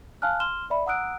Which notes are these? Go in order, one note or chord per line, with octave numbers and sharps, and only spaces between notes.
F5 G#5 A5 F6 F#6
C6 F6 E7 G7
D5 E5 B5
F#5 A#5 D#6 E6 F#6 D7